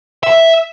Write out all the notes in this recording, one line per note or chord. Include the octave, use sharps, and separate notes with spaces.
E5